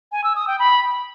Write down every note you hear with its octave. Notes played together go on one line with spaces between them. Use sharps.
G#5
E6
D#6
G5
B5